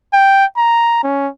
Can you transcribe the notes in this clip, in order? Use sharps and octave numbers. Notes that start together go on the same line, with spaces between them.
G5
A#5
C#4